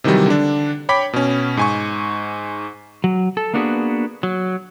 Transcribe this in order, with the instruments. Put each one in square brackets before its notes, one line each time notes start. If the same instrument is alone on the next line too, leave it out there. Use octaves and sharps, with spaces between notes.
[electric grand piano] C3 D#3 E3 F#3 G3
D3 D4
C#5 G5 B5 D6 B6
B2 C#4
G#2 G#5 C#6
[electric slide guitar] F#3
A4
A#3 B3 D4 F#4 G#4 B4
F#3